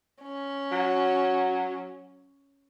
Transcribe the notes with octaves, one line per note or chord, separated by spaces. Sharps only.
C#4
F#3